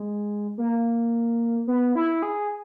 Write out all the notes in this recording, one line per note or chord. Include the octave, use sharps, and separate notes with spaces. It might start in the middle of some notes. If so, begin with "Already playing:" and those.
Already playing: G#3
A#3
B3
E4
G#4